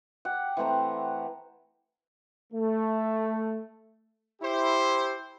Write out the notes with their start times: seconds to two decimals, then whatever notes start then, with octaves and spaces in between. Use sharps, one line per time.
0.25 G4 F#5
0.57 E3 A3 C4 A#5
2.53 A3
4.42 E4 G4 C5